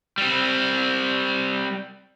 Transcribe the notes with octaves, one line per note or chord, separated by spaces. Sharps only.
G3 C4